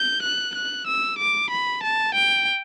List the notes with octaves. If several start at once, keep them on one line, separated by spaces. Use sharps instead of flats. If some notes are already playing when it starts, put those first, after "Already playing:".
Already playing: G6
F#6
F#6
E6
D6
B5
A5
G5